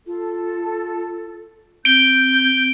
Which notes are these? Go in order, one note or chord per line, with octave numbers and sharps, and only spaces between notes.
F4 A4
C4 G6 D7 G7